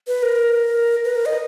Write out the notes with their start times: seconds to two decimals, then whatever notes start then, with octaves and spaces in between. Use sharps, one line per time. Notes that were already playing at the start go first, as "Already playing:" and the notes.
0.08 B4
0.23 A#4
1.05 B4
1.15 A#4
1.26 D#5